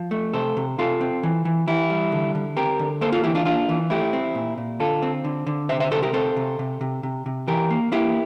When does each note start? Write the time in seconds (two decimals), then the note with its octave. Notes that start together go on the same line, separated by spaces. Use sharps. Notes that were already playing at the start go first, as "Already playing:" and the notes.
Already playing: F3
0.11 A3
0.33 C3 A4 C5
0.57 C3
0.78 C3 F4 A4
1.01 C4
1.23 E3
1.45 E3
1.67 E3 E4 G4
1.90 G3
2.12 D3
2.35 D3
2.57 C4 G4 A#4
2.79 D3
3.01 A#3 A4 C5
3.12 F4 A4
3.24 E3 E4 G4
3.35 D4 F4
3.45 A#3 D4 F4
3.69 E3
3.90 A3 E4 G4
4.13 C4
4.35 A#2
4.58 A#2
4.80 D3 F4 A4
5.02 C4
5.24 D3
5.47 D3
5.69 C3 C5 E5
5.80 C5 E5
5.91 C3 A4 C5
6.02 G4 A#4
6.13 C4 A4 C5
6.36 C3
6.59 C3
6.81 C3
7.03 C3
7.26 C3
7.47 E3 G4 A#4
7.70 A#3
7.92 A#3 E4 G4